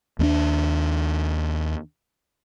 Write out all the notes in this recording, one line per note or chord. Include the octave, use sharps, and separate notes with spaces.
D#2 B3 D4